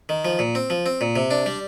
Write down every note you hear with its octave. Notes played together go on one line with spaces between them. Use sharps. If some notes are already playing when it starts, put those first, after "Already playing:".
D#3
F3
A#2
C4
F3
C4
A#2
C3
D4
G3